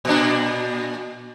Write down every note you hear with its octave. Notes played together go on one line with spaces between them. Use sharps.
A#2 D4